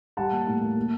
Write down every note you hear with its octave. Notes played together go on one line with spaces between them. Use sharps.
G3 F#5 A5
A#3
A2
A#3
A#3